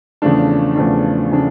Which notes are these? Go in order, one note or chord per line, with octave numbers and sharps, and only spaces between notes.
E2 C#3 F3 A3 D4
E2 C#3 F3 A3 D4
C#3 F3 A3 D4